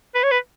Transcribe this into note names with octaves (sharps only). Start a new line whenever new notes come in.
B4
C#5
B4